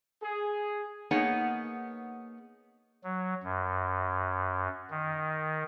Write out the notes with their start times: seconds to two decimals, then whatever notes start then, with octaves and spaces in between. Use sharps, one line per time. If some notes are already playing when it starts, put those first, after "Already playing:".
0.23 G#4
1.11 A#3 B3 D#4 G#4 C#5 F#5
3.04 F#3
3.44 F#2
4.91 D#3